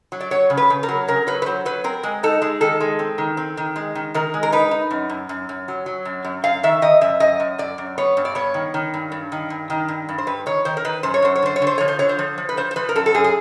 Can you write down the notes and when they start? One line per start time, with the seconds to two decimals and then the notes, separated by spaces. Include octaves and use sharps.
0.12 F#3
0.20 D5
0.31 F#3 C#5
0.50 C#3
0.57 B4
0.70 C#3
0.83 A#4
0.89 F#3
1.08 C#3 A#4
1.27 F#3 B4
1.42 B4
1.46 F#3 C5
1.65 F#3 B4
1.84 C4 A#4
2.03 G#3
2.23 D#4 A4
2.42 G#3
2.61 D#3 A4
2.80 G#3
2.99 C4
3.18 D#3
3.37 C4
3.57 D#3
3.76 G#3
3.95 D#3
4.14 D#3 A#4
4.34 G#3
4.43 A#4
4.52 D#4 B4
4.71 D#4
4.91 F#2
5.10 F#2
5.29 F#2
5.49 F#2
5.68 F#3
5.86 F#3
6.05 F#2
6.25 F#2
6.44 F#2 F5
6.63 D#3 E5
6.82 D#3 D#5
7.01 F#2 E5
7.20 F#2 D#5
7.40 F#2
7.58 F#2 D5
7.78 F#2
7.98 B3 C#5
8.17 G2
8.25 D5
8.35 B3 C#5
8.54 D#3
8.74 D#3
8.94 G2
9.12 G2
9.32 D#3
9.50 G2
9.70 D#3
9.88 G2
10.09 G2
10.18 C5
10.27 G2 B4
10.46 D#3 C#5
10.65 D#3 C5
10.77 A#4
10.85 D#3 B4
11.03 F#2 C5
11.14 C#5
11.22 F#2 C5
11.36 C#5
11.42 D3 C5
11.56 C#5
11.62 D3
11.67 C5
11.78 F3 C#5
11.88 C5
11.99 D3 C#5
12.09 C5
12.19 F3
12.38 F3
12.49 B4
12.57 F3 C5
12.71 C5
12.76 F3 B4
12.89 A#4
12.96 F#2 A4
13.06 A4
13.14 F#2 G#4
13.24 G#4